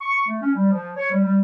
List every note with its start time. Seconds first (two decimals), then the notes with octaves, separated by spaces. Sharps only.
0.01 C#6
0.27 A3
0.42 C#4
0.54 G3
0.70 F3
0.96 C#5
1.11 G3
1.23 G3